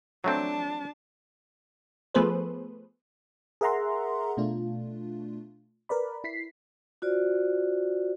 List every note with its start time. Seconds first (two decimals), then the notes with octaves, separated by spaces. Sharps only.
0.24 F#3 A3 C4 D4 A5
2.14 F3 A3 B3 G#4 B4 C5
3.61 G#4 A#4 E5 F#5 A#5 C6
4.37 B2 A3 D4 F4
5.89 A#4 B4 D5 B5
6.24 E4 B6 C7
7.02 F4 F#4 C5 D5